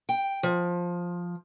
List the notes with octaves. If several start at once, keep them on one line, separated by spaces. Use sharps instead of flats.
G5
F3